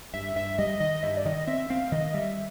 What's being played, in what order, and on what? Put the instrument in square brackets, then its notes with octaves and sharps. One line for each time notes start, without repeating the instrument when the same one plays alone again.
[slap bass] G2 [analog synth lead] E5
[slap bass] G2 [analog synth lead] E5
[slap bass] G3 [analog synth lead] D#5
[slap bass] D#3 [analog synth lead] D#5
[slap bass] G2 [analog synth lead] E5
[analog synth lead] D5
[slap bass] D#3 [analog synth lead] D#5
[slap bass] C4 [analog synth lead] E5
[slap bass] C4 [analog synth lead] F5
[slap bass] D#3 [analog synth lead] D#5
[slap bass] G3 [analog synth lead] E5